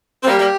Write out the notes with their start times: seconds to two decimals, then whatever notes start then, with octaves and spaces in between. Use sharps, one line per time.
0.23 C4
0.27 G3 A#3 G4
0.39 G3 A#3